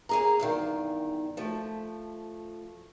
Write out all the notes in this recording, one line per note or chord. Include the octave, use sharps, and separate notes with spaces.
A#3 G#4 A#5
E2 G2 D#3
F3 A3